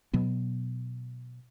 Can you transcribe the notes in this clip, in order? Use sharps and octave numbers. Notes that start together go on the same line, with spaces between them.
B2 F#3 B3